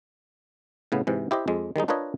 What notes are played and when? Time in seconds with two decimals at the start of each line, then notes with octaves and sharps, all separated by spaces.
0.92 A2 C#3 B3
1.07 G#2 C3 E3
1.31 E4 G4 C5 D#5
1.48 F2 G#3
1.76 D#3 G3 G#3 D#4
1.88 D4 F4 A#4 B4 C#5 D#5